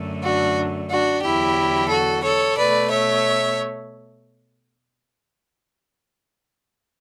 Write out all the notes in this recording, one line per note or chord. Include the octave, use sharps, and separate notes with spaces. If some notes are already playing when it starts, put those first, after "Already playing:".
Already playing: F#2 D3 A3
D4 F#4
D4 F#4
E2 D3 F#3 E4 G4
F#4 A4
A4 C#5
B2 A3 B4 D5
C#5 E5